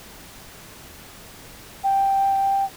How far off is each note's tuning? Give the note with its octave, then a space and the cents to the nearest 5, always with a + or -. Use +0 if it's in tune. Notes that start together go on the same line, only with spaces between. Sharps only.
G5 +0